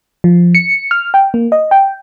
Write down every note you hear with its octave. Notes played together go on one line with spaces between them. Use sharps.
F3
C#7
F6
G5
A#3
D#5
G5